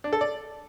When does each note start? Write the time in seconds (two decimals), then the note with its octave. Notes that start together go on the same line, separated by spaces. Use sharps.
0.04 D4
0.13 A4
0.21 D5